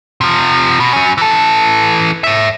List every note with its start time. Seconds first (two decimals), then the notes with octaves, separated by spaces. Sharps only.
0.21 C3 F3
0.80 B2
0.93 F#3 C#4
1.18 E3 A4
2.24 C#5 E5